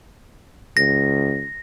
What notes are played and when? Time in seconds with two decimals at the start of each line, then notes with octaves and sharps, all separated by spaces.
0.77 C#2 A#6